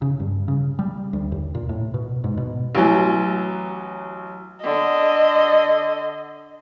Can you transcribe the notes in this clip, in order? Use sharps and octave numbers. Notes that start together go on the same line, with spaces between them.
C#3
G2
C#3
G3
D2
D#2
A#2
A2
B2
G#2
B2
A1 E3 F#3
D3 D#5